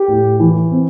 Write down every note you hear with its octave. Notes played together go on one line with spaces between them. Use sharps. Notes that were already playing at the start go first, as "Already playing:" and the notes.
Already playing: G4
A2
E3
C4